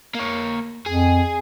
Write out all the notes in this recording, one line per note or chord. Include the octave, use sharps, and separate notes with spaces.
A#3 C#5
F2 G#4